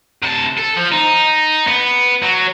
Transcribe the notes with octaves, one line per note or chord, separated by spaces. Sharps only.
C3 A5
A4
F3
D#4
B3
F#3